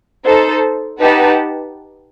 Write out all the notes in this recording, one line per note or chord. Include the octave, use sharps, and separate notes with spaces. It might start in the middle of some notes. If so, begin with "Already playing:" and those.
D#4 A4 C5
D#4 G4 B4 F#5 A5